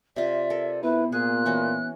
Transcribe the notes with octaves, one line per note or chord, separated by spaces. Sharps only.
C3 F4 D5 E5
A4 A#4
B3 E4 B4
A#2 G#4 F#6
E3 C#4 F#4